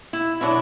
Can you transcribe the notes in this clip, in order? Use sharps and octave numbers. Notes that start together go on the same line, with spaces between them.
E4
B2 F#3 B3 D4 E4